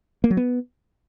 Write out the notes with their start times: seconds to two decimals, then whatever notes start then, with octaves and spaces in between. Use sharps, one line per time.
0.24 A#3
0.30 F#3
0.37 B3